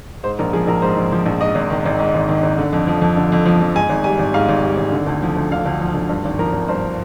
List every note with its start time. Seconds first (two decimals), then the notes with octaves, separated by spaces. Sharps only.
0.23 G#2 C5
0.39 A#1 A#4
0.53 F3 G#4
0.67 A#1 A#4
0.82 G#2 C5
0.97 A#1
1.12 F3
1.26 A#1
1.41 G#2 D#5
1.55 G#1
1.70 D#3
1.86 G#1
1.99 G#2
2.15 G#1
2.29 D#3
2.43 G#1
2.58 D3
2.73 F2
2.87 F3
3.02 F2
3.17 D3
3.32 F2
3.45 F3
3.60 F2
3.75 G#2 G#5
3.89 G#1
4.04 G3 G#5
4.19 G#1
4.34 G#2 F5
4.49 G#1
4.63 G3
4.77 G#1
4.92 D3
5.07 D2
5.22 F3
5.37 D2
5.52 D3 F5
5.66 D2
5.81 F3
5.94 D2
6.09 G2
6.25 G#1
6.39 F3 A#4
6.53 G#1
6.68 G2 C5